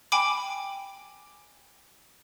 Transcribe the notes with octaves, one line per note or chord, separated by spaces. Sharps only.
G5 G#5 B5 D6